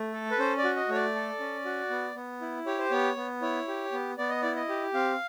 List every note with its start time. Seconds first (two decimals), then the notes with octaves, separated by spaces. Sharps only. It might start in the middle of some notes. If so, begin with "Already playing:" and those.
Already playing: A3
0.13 A4
0.31 B4
0.39 C#4 C5
0.57 D5
0.64 F#4
0.76 D#5
0.89 A3 C#5
0.95 D5
1.15 A4
1.40 C#4
1.65 F#4
1.90 B3
2.15 B3
2.41 E4
2.66 G4 C#5
2.79 C5
2.91 B3 C#5
3.16 B3
3.42 E4 C#5
3.68 G4
3.92 B3
4.18 B3 D5
4.30 D#5
4.42 E4 D5
4.56 D#5
4.69 G4
4.94 C4 F5